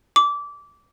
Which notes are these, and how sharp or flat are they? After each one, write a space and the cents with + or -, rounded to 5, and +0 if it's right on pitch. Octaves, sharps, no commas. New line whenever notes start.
D6 -20